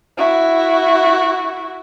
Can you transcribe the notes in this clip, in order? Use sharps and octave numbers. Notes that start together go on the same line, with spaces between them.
E4 F#4